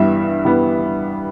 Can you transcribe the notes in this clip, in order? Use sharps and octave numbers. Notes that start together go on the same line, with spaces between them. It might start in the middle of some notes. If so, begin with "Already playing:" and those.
Already playing: G2 E3 G3 B3 E5
G2 E3 G3 B3